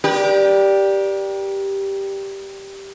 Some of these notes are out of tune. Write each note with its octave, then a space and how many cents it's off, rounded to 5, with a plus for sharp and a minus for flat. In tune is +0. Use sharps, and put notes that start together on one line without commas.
G4 +0 A#4 +45 D5 +0